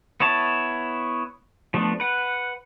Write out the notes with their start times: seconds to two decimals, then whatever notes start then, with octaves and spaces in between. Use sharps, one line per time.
0.20 B3 E4 C#5 A5
1.74 F3 A3 B3 D4
2.00 B4 F#5